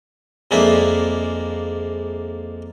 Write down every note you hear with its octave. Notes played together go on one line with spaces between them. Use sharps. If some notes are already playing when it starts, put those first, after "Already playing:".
F2 G#3 A#3 D4 E4 E5